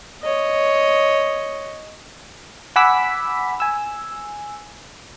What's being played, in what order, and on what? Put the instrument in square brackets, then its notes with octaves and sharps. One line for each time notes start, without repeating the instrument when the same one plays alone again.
[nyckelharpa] C#5 D#5
[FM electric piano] F#5 G#5 B5 D6 E6 B6
G#5 E6